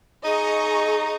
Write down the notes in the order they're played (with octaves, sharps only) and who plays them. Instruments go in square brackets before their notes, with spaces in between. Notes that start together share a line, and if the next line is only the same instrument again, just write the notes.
[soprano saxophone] D#4 [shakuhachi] G#4 [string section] D#5 A#5 C#6